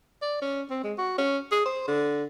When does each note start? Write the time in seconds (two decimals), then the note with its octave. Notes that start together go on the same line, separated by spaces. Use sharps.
0.22 D5
0.42 C#4
0.70 C4
0.84 G#3
0.98 F#4
1.18 C#4
1.52 G#4
1.66 C5
1.88 D3